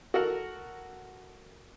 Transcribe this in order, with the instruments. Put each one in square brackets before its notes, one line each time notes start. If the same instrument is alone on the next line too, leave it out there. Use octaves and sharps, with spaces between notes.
[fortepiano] F#4 A4 A#4 F#5